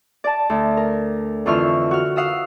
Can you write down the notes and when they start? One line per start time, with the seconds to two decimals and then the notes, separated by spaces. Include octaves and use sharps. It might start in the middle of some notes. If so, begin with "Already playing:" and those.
0.24 D5 A5
0.50 D2
0.77 A#4
1.46 F2 D3 E3 F4 C#6 F6
1.91 F#4 F6
2.16 F5 F#5 D#6 E6